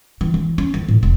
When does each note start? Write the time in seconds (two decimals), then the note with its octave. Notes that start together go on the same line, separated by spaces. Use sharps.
0.21 E3
0.34 E3
0.58 C#4
0.74 E3
0.89 A2
1.03 E1